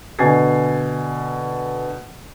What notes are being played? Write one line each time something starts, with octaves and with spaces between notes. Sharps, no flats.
B2 D3 G#5 G#6 A6 C7